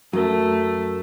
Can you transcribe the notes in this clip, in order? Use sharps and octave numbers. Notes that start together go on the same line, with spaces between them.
F#2 A3 F#4 A#4